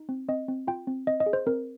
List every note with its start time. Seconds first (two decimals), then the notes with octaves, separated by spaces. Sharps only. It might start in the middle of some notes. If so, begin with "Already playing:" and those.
Already playing: D#4
0.09 C4
0.28 C4 D#5
0.48 C4
0.67 F4 G5
0.87 C4
1.07 C4 D#5
1.20 D#5
1.26 G#4
1.33 C5
1.46 C4 A#4